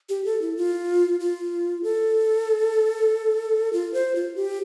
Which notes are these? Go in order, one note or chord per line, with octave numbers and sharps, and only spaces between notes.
G4
A4
E4
F4
F4
A4
F4
C5
F4
G4